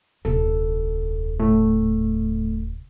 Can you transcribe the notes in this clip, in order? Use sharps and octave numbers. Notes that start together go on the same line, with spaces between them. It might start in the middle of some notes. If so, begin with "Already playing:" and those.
D#1 C2 A4
A2 A3